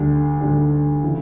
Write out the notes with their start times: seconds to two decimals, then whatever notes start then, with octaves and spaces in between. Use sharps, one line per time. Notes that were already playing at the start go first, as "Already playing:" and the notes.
Already playing: D2 D3 G3 D4
0.41 D2 D3 G3 D4
1.03 C#3 E3 A3 E4